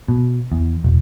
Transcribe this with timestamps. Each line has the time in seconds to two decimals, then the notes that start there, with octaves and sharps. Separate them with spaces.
0.08 B2
0.52 E2
0.84 E1